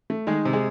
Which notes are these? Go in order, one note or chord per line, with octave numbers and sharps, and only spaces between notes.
A3
D#3 G#3 G#4
C3
G#3 G#4